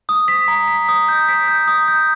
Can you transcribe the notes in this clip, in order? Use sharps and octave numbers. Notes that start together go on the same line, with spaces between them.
D#6
B6
A#5
B6
D#6
G6
B6
G6
D#6
G6